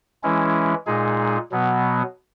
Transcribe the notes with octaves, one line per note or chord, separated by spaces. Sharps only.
E3 G#3 C#4 E4
A#2 G#3 D#4 G#4
B2 F#3 B3